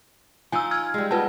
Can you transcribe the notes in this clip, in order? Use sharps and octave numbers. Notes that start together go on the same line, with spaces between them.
F3 D#4 G#5 E6
E6 F6 G#6
G3 G#3
B3 F4 B4 A5